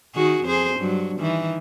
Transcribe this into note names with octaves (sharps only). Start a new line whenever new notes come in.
D#3 F#4 G#4
F2 G#4 C5
G2 F#3
D#3 E3